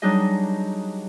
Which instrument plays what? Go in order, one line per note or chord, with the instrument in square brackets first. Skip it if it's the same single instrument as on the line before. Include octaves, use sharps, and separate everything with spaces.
[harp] F#3 G3 D4 D#4 G#4 D#5